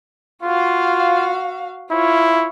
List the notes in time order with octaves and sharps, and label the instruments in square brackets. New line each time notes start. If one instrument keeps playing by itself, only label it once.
[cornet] F4 [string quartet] F#4 F5
[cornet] E4 [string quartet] F4 C#5